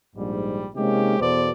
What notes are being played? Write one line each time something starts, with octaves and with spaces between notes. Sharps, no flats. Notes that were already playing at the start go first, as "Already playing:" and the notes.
A#1 G#2 G3
C3 G#3 A#3 C#4 D#4 G4
E2 B2 B3 A4 C5 D5